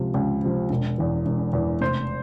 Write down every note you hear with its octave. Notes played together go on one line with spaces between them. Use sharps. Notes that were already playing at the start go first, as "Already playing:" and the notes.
Already playing: C#2 C3 F3
C#2
C3 F3
E1
E2 E3
E1
E2 E3
F1 C5